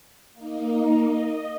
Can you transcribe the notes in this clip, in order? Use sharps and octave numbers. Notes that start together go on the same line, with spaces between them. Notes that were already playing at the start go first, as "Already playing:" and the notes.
A#3 D#4
D#5